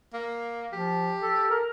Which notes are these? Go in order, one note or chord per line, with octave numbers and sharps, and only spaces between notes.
A#3
F3 G4
A4
A#4